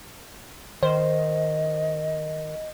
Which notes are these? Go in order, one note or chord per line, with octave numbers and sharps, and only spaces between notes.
D#3 C5 D#5